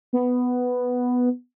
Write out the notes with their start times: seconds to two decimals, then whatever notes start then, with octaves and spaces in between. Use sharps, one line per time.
0.13 B3